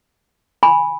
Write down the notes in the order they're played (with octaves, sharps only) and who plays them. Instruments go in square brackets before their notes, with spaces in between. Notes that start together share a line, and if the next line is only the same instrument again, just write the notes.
[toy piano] G#5 B5